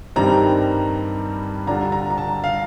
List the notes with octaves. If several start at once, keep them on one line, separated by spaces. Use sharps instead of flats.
G2 D#3 G3 C4 A#5
D3 G3 D4 F4 A#5
A#5
A#5
A5
F5